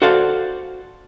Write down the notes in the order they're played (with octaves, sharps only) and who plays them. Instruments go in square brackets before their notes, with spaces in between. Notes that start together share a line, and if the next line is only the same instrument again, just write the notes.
[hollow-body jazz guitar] F#4 A4 C5 D5 F5